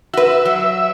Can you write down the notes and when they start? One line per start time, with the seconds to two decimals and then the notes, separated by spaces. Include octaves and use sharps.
0.14 F#4 B4 E5
0.45 F#3